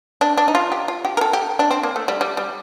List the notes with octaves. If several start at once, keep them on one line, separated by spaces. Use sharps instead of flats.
D4
D4
D#4
F4
G4
F4
G4
A#4
A4
G4
D4
C4
A#3
A3
G3
G3
G3